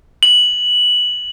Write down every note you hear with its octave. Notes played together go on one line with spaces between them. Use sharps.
F#7